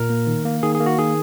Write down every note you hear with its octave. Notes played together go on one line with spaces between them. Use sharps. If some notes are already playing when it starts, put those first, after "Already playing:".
Already playing: A#2 A#4
A#3
D#3
A#3
D#3 G#4
G#4
A#3
F#4
D#3 G#4